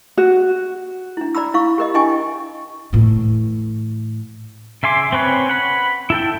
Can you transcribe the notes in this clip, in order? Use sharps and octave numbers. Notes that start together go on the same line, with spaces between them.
F#4
D4 E4
D5 A#5 B5 E6
E4 F5 C#6
G4 A#4 D#5
D4 E4 D#5 G5 G#5 C#6
A2 E3
C#3 E5 G#5 C6 D6
C4 C#4 B4 C#5
F#5 B5
E4 A4 G5